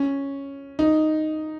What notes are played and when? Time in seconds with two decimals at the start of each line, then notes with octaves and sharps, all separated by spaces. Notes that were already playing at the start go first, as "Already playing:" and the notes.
Already playing: C#4
0.79 D#4